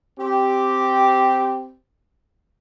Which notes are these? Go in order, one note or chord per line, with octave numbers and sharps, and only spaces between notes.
C4 G4